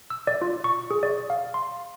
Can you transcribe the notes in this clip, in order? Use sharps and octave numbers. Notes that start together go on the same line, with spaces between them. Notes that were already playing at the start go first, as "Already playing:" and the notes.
E6
D5
F4
C#6
G#4
D5
F5
C6